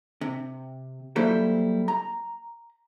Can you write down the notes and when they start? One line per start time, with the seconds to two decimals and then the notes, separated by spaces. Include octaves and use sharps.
0.21 C3
1.16 F#3 G3 A#3 E4 A4 C5
1.88 A#5